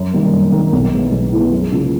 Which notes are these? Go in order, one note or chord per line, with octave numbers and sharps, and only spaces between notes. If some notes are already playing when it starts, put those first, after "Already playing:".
Already playing: F#2
D#3 G3 A#3
F#2
D#3 G3 A#3
B1
A2 E3 G#3 B3
B1
A2 E3 G#3 B3
F#2
C#3 F3 A#3